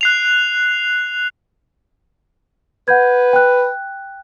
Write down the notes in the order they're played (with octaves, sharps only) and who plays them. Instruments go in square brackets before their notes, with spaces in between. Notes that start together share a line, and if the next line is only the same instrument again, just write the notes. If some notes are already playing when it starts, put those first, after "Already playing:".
[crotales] F#6 C7 F7
[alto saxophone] B4 [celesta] F#5 G6 G#6
[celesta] G5 F#6